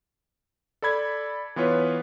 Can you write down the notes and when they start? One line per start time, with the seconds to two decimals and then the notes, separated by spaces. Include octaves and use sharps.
0.82 A4 D5 B5 G#6
1.56 E3 B3 F4 B4 C#5